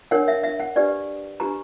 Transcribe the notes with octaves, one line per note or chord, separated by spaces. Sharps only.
D4 A#4 C#5 F#5
E5
E5
F#5
D4 G4 B4 D5
D4 G4 B4 A#5